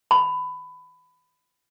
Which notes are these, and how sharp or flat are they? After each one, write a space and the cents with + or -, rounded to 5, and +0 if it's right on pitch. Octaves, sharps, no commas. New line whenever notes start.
B5 +20